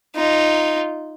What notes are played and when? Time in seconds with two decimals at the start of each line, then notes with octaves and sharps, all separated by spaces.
0.15 D#4 F4